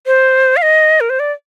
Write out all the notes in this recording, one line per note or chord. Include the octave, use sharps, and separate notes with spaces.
C5
F5
D#5
A#4
C5
D5